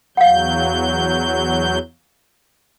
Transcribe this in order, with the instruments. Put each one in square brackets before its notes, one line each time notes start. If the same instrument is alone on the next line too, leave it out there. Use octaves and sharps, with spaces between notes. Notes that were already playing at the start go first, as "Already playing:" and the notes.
[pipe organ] E2 F#3 G6 [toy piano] F5 F#5